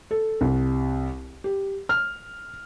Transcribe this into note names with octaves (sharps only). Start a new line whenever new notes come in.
A4
C2
G4
F6